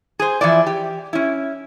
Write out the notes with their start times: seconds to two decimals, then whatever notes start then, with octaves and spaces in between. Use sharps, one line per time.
0.19 G#4 C5
0.41 E3 F3 E4 D5
0.67 G4
1.13 C#4 E4